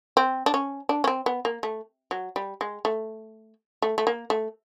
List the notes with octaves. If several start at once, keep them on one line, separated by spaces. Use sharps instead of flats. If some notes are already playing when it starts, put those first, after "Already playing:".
C4
D4
C#4
D4
C#4
C4
B3
A#3
A3
F#3
G3
G#3
A3
A3
A3
A#3
A3